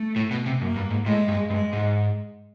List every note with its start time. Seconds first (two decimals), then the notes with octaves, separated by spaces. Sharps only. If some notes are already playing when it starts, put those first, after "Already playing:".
Already playing: A3
0.16 A2
0.31 B2
0.46 C3
0.61 F#2 A#3
0.76 G2
0.91 G#2
1.05 A2 G#3
1.28 G2
1.50 G2 G#3
1.73 G#2